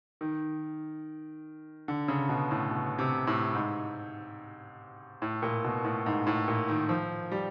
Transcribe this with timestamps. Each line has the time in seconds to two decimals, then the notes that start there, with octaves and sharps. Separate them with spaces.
0.21 D#3
1.88 D3
2.08 C#3
2.29 B2
2.51 A2
2.71 B2
2.99 C3
3.27 A2
3.55 G#2
5.22 A2
5.42 A#2
5.64 B2
5.84 A2
6.06 G#2
6.27 A2
6.48 A#2
6.68 D#3
6.89 F3
7.32 G3